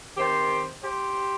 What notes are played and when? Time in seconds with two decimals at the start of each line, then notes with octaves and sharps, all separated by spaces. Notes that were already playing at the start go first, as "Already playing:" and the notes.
0.18 D#3 C4 G4 C5
0.83 G4 C5